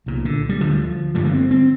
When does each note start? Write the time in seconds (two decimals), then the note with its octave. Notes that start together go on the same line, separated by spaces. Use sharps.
0.06 C2 A#2
0.25 D3
0.49 G3
0.61 D2 D3 F3
1.15 G1 G2 D3 G3
1.25 A#3
1.33 C4
1.51 C4